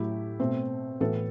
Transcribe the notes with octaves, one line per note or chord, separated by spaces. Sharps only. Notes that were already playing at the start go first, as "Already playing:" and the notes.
Already playing: A2 F#3 A3 E4 G4
B2 A3 C4
A2 E3 B3 F#4 A4